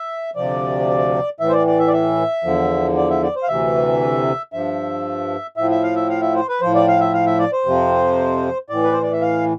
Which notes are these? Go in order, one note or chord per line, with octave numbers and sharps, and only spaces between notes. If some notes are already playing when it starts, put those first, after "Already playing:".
Already playing: E5
D2 C3 F3 D5
A2 E3 E5
C5
D5
D5
E5
D5
E5
E2 D3 F3
D5
E5
D5
C5
F5
D2 C3 E3 E5
G2 F3 E5
A2 F3 E5
E5
F5
E5
F5
E5
C5
B4
A2 F3 C5
D5
F5
E5
F5
E5
D5
C5
F2 C3 F3
A2 E3 D5
B4
C5
D5
E5
F5